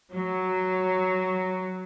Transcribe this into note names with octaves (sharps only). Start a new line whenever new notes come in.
F#3